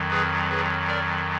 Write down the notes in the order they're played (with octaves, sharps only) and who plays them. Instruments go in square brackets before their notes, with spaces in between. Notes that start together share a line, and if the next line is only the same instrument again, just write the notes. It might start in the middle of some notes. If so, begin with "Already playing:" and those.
Already playing: [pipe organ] F2 D#3 F#3
G#4 B4
G#4 B4
A#4 D5